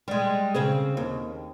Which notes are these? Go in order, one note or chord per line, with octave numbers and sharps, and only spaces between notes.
G3 G#3
C#3 C4 G#4
D#2